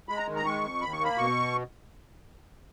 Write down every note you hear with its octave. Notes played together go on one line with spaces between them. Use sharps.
G#3 B5
A#5
D#3
A#5
G#3 C#6
F2
D#2 B5
C#6
A#3
B5
B2 C#6